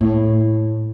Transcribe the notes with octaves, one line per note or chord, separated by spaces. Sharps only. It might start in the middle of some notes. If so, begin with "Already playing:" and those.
A2